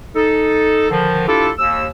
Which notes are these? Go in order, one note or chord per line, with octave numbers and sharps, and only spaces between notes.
D#4 A4
D3 D#3 F3
D4 E4 F4 G4 A4
D#2 E6